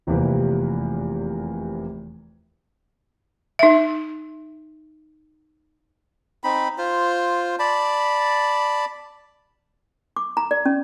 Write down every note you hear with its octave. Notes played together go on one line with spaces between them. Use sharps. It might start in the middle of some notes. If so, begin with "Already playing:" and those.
F1 E2 C3 E3 A#3 B4
D#4 E5
C4 D#4 B5
F4 C5
D5 A5 B5
D6
A#5
D5
C#4